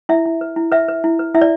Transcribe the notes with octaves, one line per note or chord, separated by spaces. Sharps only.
E4 E5
E4
B4
E4
B4 E5
B4
E4
B4
E4 E5
D5